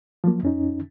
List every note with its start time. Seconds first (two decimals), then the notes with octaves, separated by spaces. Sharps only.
0.24 F3 F#3 A#3
0.43 F2 C#4 D#4